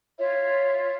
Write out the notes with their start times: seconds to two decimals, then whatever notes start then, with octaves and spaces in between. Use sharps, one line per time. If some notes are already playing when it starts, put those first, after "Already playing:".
0.19 F4 C#5 E5